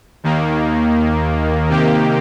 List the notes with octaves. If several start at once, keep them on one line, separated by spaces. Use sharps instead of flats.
D#2 D#3 A#3
C3 D#3 A#3 G4